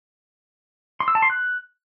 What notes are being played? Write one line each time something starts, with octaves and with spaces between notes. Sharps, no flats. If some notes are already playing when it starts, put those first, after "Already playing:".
C6
E6
A5
C6
F#6